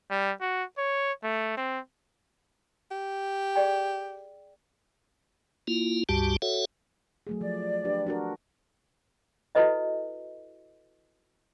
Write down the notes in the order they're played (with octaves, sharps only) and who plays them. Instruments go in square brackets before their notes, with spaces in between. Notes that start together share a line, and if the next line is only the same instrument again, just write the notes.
[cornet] G3
F#4
C#5
A3
C4
[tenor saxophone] G4
[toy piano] G#4 D5 G5
[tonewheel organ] A#3 E4 F4
C#2 G2 G3 F#4 G4 A5
F#4 A4 C#5 E5 F#5
[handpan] F#3 A3 G#4
[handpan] F3 [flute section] D5
[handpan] D4 G4 B4
D4 F#4 A#4
[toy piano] E4 F#4 A4 B4 D#5 E5